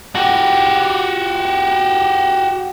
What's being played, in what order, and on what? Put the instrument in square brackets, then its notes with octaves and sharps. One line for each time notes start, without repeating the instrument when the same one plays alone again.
[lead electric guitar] F#4 G4